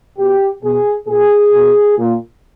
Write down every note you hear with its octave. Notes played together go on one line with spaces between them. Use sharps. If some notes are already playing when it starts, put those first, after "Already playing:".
B2 G4
B2 G#4
A#2 G#4
B2
A#2